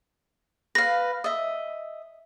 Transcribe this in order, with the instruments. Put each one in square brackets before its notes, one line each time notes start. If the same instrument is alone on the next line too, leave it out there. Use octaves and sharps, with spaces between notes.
[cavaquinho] B4 F5 [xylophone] A#6
[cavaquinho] D#5 E5